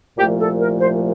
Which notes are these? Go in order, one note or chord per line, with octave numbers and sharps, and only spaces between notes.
C2 A#2 F3 A3 G4
A4
A#4
C5